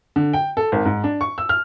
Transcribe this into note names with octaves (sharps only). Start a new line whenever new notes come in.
D3
G5
A4
G#1
G#2
D4
C#6
E6
F6